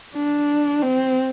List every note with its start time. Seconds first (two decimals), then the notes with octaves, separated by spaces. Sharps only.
0.15 D4
0.82 C4